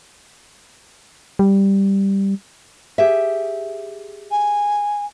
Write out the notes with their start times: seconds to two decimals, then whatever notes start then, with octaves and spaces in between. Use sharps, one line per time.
1.39 G3
2.98 G4 G#4 E5
4.31 G#5